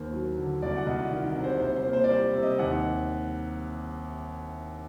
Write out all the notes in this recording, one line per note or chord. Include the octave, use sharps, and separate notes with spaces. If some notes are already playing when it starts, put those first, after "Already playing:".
Already playing: D#2 A#3 C5
F#3
D3
C2 D5
F#5
C2 D#5
D#3
C3
C5
C2 C5
C5
A#3
C5
D5
G3 C5
C3
D#5
D#2 F#5